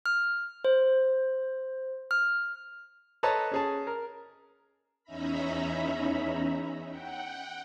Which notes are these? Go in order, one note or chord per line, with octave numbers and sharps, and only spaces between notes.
F6
C5
F6
A4 B4 C#5 D#5 A5 A#5
C#4 G#4 A5
A#4
E2 C#4 D#4 E5 A#5 B5
F#5 G5